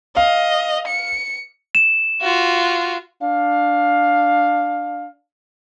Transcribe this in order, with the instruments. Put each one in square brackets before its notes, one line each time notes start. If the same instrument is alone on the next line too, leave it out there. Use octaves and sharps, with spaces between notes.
[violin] D#5 [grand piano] F5
[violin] C#7
[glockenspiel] E7
[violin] F4 F#4
[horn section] D4 F5